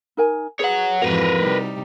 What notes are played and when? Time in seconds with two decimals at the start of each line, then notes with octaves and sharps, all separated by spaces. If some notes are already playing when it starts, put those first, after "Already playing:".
0.17 D#4 A#4 G#5
0.60 G#4 B4 C#5 F#5
1.02 F2 G#2 E3 F#4 A#4 B4
1.38 C3 G3 D#4